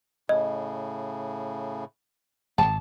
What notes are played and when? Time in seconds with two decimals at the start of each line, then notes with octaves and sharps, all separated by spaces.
0.29 A2 C#3 D#5
2.58 D1 G#1 A5